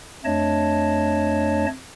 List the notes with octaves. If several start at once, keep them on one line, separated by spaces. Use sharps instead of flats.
F2 A3 D4 C#5 D#5 A5